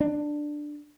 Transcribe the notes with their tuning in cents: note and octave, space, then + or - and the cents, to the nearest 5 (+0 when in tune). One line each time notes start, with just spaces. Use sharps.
D4 +10